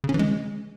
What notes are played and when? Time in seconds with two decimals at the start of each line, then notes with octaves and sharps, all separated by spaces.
0.04 C#3
0.09 C#4
0.14 E3
0.19 G#3